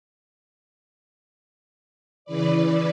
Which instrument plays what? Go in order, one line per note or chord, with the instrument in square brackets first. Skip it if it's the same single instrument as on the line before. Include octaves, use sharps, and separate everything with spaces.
[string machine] C#3 E3 B4 D5